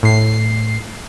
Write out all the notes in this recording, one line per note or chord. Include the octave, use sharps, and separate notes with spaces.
A2 C7